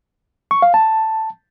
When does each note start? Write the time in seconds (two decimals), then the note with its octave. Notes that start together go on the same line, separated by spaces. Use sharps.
0.51 C#6
0.62 F5
0.74 A5